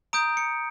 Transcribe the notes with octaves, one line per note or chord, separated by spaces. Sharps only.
A#5 D#6 G6 D7
C#7